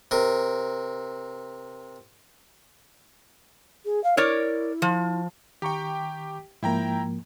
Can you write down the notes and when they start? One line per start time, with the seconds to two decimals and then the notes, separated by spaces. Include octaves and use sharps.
0.11 C3 A#4
3.85 G#4
4.03 F5
4.17 E4 A#4 C#5 D5
4.82 F3
5.62 D#3 G4 G5 A#5 C#6
6.63 G#2 F3 A#3 E4 G5 A#5